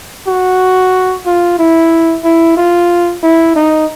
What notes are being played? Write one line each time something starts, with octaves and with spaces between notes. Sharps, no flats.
F#4
F4
E4
E4
F4
E4
D#4